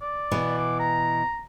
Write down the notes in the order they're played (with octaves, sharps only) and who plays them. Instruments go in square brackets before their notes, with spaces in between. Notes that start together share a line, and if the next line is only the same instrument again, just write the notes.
[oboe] D5
[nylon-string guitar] B2 E3 B3
[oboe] D6
A#5